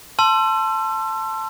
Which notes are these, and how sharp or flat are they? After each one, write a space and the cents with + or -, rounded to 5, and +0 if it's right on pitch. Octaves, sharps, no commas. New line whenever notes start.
A5 +0 C6 +10 E6 +35